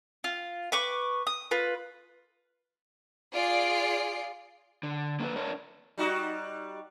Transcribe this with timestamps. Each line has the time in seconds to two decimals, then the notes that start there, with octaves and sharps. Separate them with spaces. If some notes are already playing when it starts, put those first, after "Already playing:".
0.24 F4
0.72 B4 C#6 D6
1.27 D#6
1.51 F4 B4
3.35 F4 G#4 D5 C7 D7
4.83 D3
5.20 A#3 C#4 E4 A4 B4
5.36 D4 A#4 C#5
5.98 G3 D#4 F#4